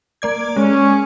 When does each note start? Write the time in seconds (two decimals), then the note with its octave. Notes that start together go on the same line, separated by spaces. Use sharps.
0.22 A#3 D5 G#6
0.56 G#3 C#4